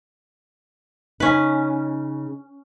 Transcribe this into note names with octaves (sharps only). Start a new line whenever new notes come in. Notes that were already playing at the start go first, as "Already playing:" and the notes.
C#3 C#4 D#4 B4